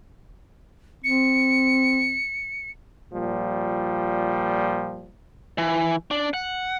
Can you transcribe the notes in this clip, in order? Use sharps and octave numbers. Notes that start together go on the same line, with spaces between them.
C4 C#7
A#2 F3 G3
E3
D4
F#5